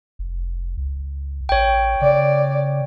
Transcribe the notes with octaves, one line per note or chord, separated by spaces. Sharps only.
F1
C#2
A1 C#5 G5
C#3 D5